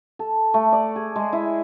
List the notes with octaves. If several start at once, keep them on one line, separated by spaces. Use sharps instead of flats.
A4
A3
D5
G#4
G#3
E4